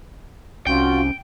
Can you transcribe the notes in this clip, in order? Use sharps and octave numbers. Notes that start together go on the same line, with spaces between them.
C2 C#4 F4 F#4 G5